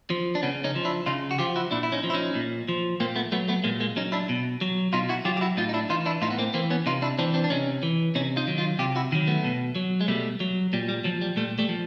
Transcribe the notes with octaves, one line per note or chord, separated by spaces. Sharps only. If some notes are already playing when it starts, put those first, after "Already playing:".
F3
D4
C#3 B3 C#4
C#4 D#4
F3
D4 E4
C#3 D#4 F4
F#4
F3 F4 G4
E4 F#4
A#2 D4 E4
E4
C#4 D#4
F3
E4
C#4 D#4
A#2
F3
A#2 A#3 C4
A3 B3
F#3 A3 B3
A3 B3
A#2 G#3 A#3
G#3 A#3
F#3 C#4 D#4
D4 E4
B2
F#3
B2 D#4 F4
E4 F#4
F#3 F4 G4
G4
E4 F#4
A2 D#4 F4
D#4
D4 E4
E3 D#4 F4
D4 E4
A2 D#4 F4
B3
A#3 C4
E3 A#3 C4
B3 C#4
C3 D#4 F4
D4 E4
E3 C4 D4
C4 D4
D4
C3 C#4 D#4
E3
C3 C#4 D#4
D#4 F4
D#3 F#3
D#4 F4
C3 F4 G4
E4 F#4
D#3 F#3
A3 B3
B2
F#3
G#3
B2 G3 A3
F#3
A#2 G3
G3
F3 F#3
G3
A#2 G3 A3
G3 A3
F3